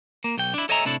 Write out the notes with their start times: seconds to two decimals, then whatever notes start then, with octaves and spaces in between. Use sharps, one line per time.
0.24 A#3
0.37 B1 G5
0.54 D4 E4
0.69 A4 C#5 D#5 E5 G#5 A#5
0.85 A2 C3 D4 E4 A4